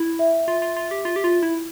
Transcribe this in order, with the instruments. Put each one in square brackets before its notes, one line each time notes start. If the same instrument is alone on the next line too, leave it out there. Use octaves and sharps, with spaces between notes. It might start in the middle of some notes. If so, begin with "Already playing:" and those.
Already playing: [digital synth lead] E4
[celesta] E5
[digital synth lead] F4 [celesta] E5
[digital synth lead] F4
F4
G4
F4
G4
F4
E4